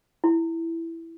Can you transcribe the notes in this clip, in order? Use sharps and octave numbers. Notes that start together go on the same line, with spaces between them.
E4